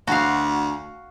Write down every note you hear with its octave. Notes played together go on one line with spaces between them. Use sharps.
D2 F#4 F5